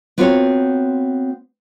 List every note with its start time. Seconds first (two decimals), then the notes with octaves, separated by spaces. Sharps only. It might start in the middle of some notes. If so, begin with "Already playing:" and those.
0.18 B3 C4 F4 F#4 A#4 C#5